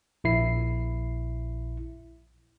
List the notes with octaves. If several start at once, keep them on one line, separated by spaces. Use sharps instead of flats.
A#1 E4 C7